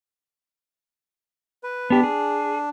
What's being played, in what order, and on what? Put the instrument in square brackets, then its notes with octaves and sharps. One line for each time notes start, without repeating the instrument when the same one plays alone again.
[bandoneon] B4
[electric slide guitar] B3 G4 [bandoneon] D4
[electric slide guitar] G#4